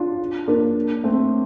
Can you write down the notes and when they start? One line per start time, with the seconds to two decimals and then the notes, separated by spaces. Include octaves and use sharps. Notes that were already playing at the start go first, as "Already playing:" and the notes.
Already playing: D4 F4
0.48 A#3 D4
1.04 A3 C4